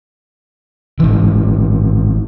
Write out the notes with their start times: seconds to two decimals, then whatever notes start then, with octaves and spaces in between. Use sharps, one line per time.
1.00 G#1 E3